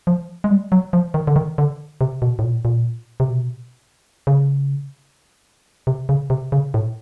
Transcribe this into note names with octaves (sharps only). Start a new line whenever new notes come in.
F3
G#3
G3
F#3
F3
D#3
D3
D#3
D3
C3
B2
A2
A#2
A#2
C3
B2
C#3
C3
C#3
C3
C#3
A2